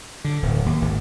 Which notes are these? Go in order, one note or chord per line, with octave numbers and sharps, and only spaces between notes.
D3
D1
D#2
G#1